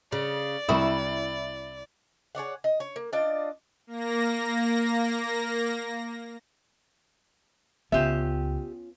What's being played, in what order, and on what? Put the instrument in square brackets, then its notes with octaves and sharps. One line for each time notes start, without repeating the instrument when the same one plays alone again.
[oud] C#3 [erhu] D5
[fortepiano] C2 C#6 D#6 [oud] E4
[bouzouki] G#4 C#5 D5 F#5
D#5
C#5
A#3
D4 F4 D5 D#5
[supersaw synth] A#3 A#6
[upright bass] C#2 [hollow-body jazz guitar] B3 C#4 F4 [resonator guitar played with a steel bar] G4 E5